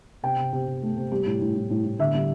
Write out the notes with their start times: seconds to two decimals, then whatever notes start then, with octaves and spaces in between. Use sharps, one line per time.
0.23 C3 G5
0.38 C3
0.53 C3
0.67 C3
0.82 A3
0.97 C3
1.11 G3 G4
1.26 A2
1.41 A2
1.56 A2
1.70 A2
1.85 A2
1.99 D3 E5
2.14 G3